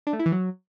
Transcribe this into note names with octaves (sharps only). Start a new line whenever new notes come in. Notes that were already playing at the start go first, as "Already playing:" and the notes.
D4
A3
E4
E3
F#3